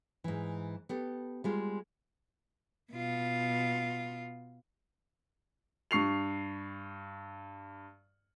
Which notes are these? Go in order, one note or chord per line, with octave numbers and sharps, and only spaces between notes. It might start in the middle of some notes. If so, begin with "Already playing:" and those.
G#2 E3
B3 G4 A4
G3 G#3 F4
B2 F4
G2 C#6 C7 F7